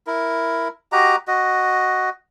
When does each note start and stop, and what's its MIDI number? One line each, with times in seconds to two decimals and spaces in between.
0.07 0.68 64
0.07 0.68 70
0.92 1.16 66
0.92 1.16 67
0.92 1.16 75
0.92 1.16 82
1.28 2.10 66
1.28 2.10 75